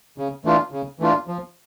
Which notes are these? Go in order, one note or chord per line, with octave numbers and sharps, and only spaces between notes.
C#3
E3 A3 D4 F4
C#3
E3 A3 D4 F4
F3